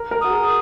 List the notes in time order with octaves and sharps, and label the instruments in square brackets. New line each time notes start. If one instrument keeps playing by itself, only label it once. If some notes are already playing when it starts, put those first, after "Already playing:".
Already playing: [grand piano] A#4
A#4
[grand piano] F#4 [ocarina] D#6
[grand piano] G#4